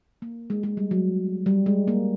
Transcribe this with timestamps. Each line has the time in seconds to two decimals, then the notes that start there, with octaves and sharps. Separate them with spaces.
0.22 A#3
0.50 G#3
0.63 G#3
0.77 G3
0.91 F#3
1.46 G3
1.66 G#3
1.88 A#3